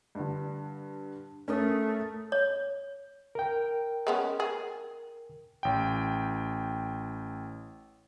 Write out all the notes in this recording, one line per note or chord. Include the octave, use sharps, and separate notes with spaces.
G2 D3
A3 C#4 A#4 D#6
C#5
A#4 G5
G#3 B3 C#4
G#4
A1 G5